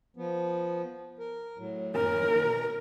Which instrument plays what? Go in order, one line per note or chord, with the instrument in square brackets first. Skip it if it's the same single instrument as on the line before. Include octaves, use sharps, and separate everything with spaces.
[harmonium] F3 B3
A#4
A2 F#3
[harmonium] F#2 C#4 [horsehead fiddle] A#4
[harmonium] B2 A#5